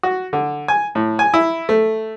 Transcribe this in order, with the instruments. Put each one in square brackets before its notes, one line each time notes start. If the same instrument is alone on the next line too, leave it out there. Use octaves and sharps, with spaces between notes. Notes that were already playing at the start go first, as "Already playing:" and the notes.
[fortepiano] F#4
D3
G#5
A2
G#5
E4
A3